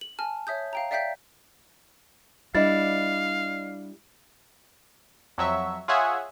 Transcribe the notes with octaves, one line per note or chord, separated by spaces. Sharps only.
F#7
G#5 A5 F6
C#5 E5 D#6 G6
F5 G5 A#5
D5 E5 F5 G5 G6 B6
G3 D4 E4 D#5 F5 A6
F2 F#3 E5 C#6
F4 G#4 C#5 E5 F#5 G#5